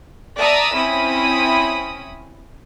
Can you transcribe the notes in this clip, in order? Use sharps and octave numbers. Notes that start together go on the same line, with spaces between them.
D5 E5 A5 A#5 D#6 E6
C4 C#4 E4 B5 D#6